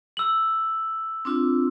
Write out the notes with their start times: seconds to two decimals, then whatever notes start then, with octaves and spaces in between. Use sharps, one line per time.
0.17 E6 F#7
1.25 C4 D4 F4